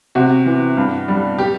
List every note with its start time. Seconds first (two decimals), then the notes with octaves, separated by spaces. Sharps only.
0.15 C3 F#4
0.46 E3
0.77 G2
1.08 G3
1.38 G4